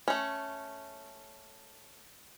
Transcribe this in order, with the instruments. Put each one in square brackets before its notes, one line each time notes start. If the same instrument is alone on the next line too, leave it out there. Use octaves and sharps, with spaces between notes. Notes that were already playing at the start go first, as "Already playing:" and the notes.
[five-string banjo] A3 C#4